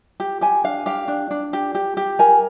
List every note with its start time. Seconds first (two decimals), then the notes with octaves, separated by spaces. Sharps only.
0.20 G4
0.41 G4 G#5
0.64 D4 F5
0.86 G4 F5
1.08 D4
1.31 D4
1.53 G4
1.75 G4
1.97 G4
2.19 A#4 G#5